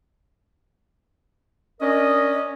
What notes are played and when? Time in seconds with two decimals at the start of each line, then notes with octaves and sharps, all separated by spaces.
1.81 C#4 D4 A#4 D#5